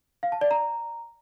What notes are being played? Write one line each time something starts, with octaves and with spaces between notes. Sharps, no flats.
F5
A5
D5
A#5